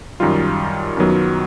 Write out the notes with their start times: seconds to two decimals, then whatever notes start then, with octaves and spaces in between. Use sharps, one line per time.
0.20 F#2 D#3 G3 F4
0.97 F#2 D#3 F#3 B3